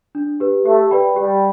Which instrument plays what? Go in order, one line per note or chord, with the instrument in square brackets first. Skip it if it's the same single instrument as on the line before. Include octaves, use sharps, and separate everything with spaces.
[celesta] D4
G4 B4
[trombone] A3 [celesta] G4
[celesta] B4 D5 G5 B5
[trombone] G3 [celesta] G4